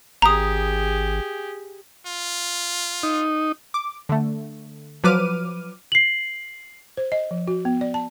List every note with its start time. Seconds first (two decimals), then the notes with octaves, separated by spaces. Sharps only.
0.22 G#1 G4 G#4 A#5 D#6
2.07 F4
3.03 D#4
3.74 D6
4.09 D3 A3
5.04 F3 F#3 B4 D6 F6 D#7
5.92 C7 F#7
6.97 C5
7.12 D#5
7.31 F3
7.47 F#4
7.65 B3
7.81 D5
7.94 A5